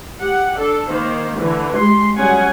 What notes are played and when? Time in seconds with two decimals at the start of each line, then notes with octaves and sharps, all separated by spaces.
0.22 G4 F#5
0.60 D4 A4
0.89 D#3 A#3 C5
1.38 D3 E3 A3
1.78 G#3 G4 C6
2.17 F#3 G3 C#4 G#4 F#5 G#5